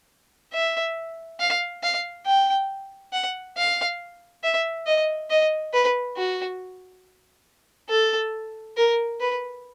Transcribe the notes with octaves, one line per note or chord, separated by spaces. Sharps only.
E5
F5
F5
G5
F#5
F5
E5
D#5
D#5
B4
F#4
A4
A#4
B4